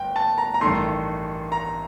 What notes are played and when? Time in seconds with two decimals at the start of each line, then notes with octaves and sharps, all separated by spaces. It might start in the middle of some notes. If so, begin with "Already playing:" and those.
Already playing: G1 G5
0.16 A5
0.38 A#5
0.54 A#5
0.61 A1 G2 D#3 A3 C6
1.52 A#5